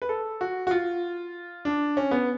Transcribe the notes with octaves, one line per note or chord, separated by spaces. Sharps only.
B4
A4
F#4
F#4
F4
D4
C#4
B3